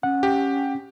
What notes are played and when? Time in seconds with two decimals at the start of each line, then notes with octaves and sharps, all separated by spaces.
0.03 C#4 F#5
0.23 G4